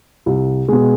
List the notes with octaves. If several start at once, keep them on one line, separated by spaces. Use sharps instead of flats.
C2
B2 G#3